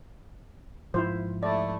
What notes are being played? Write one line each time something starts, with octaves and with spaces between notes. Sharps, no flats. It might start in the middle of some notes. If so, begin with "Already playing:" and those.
G#2 F3 E4 F4 C5
A3 E4 D5